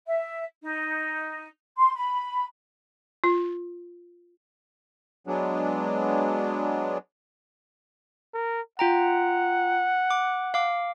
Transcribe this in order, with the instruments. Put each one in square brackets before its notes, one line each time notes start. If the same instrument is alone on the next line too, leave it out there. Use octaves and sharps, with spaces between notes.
[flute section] E5
D#4
C6
B5
[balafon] F4
[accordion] F#3 G#3 B3 D4
[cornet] A#4
[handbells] F4 G5 A#5 [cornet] F#5
[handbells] D6
F5 D6